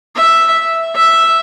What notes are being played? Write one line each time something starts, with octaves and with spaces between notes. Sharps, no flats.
E5
E5